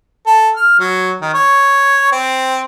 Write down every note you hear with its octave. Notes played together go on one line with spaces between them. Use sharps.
A4
F6
F#3
D#3
C#5
C4